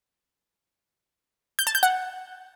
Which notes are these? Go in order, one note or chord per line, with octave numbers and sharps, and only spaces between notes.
G6
A5
G6
F#5